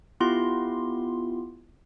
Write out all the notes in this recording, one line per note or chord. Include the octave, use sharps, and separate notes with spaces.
B3 E4 F4 G4 C6